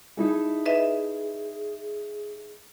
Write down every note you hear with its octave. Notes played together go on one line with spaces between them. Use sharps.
D#4 E4 G#4 A4
B4 D#5 E5